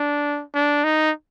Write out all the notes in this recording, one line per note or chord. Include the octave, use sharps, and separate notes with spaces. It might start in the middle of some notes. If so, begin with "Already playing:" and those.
Already playing: D4
D4
D#4